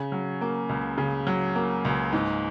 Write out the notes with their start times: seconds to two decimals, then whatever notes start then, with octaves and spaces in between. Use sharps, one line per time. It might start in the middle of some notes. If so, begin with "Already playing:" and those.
Already playing: C#3
0.12 F#3
0.41 A#3
0.69 C#2
0.98 C#3
1.27 F#3
1.55 A#3
1.85 C#2
2.13 G#2